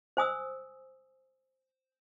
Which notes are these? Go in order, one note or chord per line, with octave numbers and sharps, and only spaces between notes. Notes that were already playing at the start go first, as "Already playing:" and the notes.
C5 G#5 D#6 E6